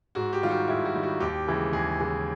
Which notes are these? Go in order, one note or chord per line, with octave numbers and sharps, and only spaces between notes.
G#2 F#4
G4
D#3 G3 F4
F#4
G#2 E4
F#4
D#3 G3
F#4
D#2 G4
C#3 E3 G#3
D#2 G#4
C#3 E3 G#3